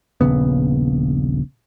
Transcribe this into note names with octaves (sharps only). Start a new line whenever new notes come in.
D#1 A#1 C#3 B3